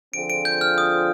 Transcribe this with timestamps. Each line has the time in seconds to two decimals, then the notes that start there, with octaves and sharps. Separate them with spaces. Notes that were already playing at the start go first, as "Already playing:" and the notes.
0.13 D3 F3 C4 F4 G#4 D7
0.30 D7
0.45 G6
0.61 F6
0.78 D#6